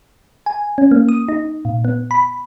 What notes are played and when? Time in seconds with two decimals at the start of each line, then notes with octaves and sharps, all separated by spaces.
0.46 G#5
0.78 C#4
0.91 A#3
1.09 D#6
1.29 D#4
1.65 A#2
1.85 B3
2.11 B5